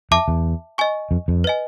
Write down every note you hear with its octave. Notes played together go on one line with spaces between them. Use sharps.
F2 E5 A5 D6
E2
D#5 G#5 C#6
F2
F2
B4 D#5 G#5